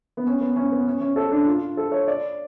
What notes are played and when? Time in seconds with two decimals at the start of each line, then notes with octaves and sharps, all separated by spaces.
0.17 B3
0.27 C#4
0.41 B3
0.56 C#4
0.72 B3
0.87 C#4
1.01 C#4
1.16 A4
1.31 D4
1.46 F4
1.77 A4
1.92 C#5
2.08 D5